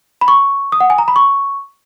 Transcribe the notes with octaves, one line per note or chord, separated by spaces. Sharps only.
B5
C#6
D#6
F#5
G#5
A#5
B5
C#6